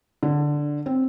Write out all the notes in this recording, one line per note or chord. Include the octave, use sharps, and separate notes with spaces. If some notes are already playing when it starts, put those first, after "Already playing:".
D3
C4